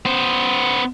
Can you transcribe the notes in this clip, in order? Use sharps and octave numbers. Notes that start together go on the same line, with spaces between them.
B3 C5